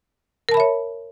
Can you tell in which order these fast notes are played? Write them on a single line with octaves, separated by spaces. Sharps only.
A#4 A5 B5 E5 C#5